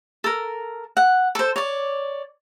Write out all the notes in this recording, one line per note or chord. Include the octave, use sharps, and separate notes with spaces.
A4 A#4
F#5
A4 C5
C#5 D5